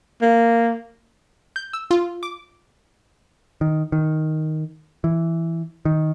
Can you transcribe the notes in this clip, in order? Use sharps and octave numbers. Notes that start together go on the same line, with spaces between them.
A#3
G6
E6
F4
D6
D#3
D#3
E3
D#3